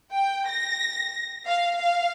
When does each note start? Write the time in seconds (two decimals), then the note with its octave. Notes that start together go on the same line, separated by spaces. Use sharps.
0.12 G5
0.47 A#6
1.46 F5
1.79 F5